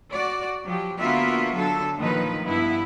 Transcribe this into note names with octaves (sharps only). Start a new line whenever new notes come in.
F#4 D5
F3 F#3 G4
D3 A#3 B3 F4 F#4 E5
D3 F#3 A4
A#2 D#3 F3 F#3 D#4 B4
G2 B3 E4